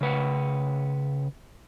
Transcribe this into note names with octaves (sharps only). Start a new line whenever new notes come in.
C#3 B4 F#5